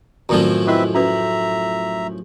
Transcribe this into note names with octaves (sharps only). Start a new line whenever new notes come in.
F#2 A2 D#3 F3 F#3 C4
C4 E4 A4 B4 D#5 E5
C#4 F#4 B4 E5 A#5